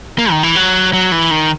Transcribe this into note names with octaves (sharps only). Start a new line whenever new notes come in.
A#3
D#3
E3
F#3
F#3
E3
D#3